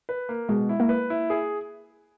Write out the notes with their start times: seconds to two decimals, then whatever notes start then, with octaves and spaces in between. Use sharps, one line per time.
0.09 B4
0.29 A#3
0.49 B2 G#3
0.69 E4
0.80 A#3
0.89 B4
1.10 E4
1.30 G#4